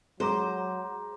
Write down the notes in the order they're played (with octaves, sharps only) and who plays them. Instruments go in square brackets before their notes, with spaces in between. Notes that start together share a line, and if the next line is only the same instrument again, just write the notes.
[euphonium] F#3 [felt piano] G#3 A#5 D6 [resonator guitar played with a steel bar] C5